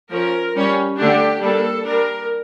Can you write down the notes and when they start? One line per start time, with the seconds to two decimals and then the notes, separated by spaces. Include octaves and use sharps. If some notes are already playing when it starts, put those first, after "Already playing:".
0.11 F3 C#4 A#4
0.55 G3 C#4
0.98 D3 A3 D4 G4
1.41 G3 A#3 D4 A4
1.85 G3 D4 A#4